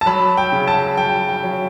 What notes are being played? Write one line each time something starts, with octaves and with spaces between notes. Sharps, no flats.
A5
F#3 B5
G5
C#3
A5
F#3 G5
G5
F#3